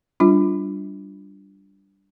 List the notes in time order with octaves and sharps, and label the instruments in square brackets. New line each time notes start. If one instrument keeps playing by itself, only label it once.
[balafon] G3 D4 F4